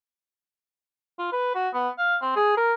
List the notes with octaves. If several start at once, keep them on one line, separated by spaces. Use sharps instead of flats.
F4
B4
F#4
B3
F5
C4
G#4
A#4